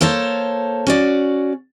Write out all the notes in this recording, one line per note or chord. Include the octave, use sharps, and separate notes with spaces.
A#3 A4 C5 C#5 A5
C#4 F#4 D5